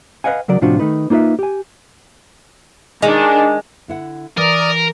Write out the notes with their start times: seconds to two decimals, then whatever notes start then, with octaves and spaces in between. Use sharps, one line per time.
0.24 B4 D#5 F5 F#5 G#5
0.48 C#3 F#3 A#4 D5
0.61 A2 C3 F3 D4 F4 F#4
0.79 D#3 A3 D#4 B4
1.10 A#3 D#4 F4 B4 E5
1.39 G4 G#5
3.02 D#3 G#3 D4
3.88 D3 E4 F#5
4.37 E3 A#4 D5 D#6